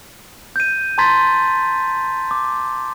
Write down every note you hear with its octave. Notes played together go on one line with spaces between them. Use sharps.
G6 D#7
A5 A#5 C6 G#6 A6 B6
D6